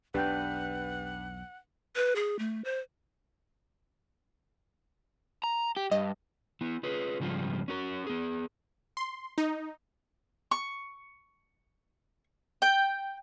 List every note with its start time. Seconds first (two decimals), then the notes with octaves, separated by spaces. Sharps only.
0.14 B1 E2 D4 G4 B4 F#5 G5 G6
1.96 B4
2.16 G#4
2.39 A3
2.65 C5
5.44 A#5
5.77 G4
5.91 G2 D#5
6.61 B3 E4
6.83 F4 G#4 B4
7.20 G#2 C#3 F3 G3 F4
7.68 C#4 F#4 A#4
8.07 B3 G#4
8.97 C6
9.38 D#4
10.51 C#6
12.62 G5